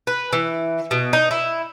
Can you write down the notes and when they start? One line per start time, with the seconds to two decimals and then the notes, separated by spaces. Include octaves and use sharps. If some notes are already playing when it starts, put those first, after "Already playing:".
0.07 B4
0.33 E3
0.91 B2
1.13 D#4
1.31 E4